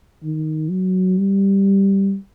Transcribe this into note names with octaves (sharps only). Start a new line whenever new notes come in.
D#3
F#3
G3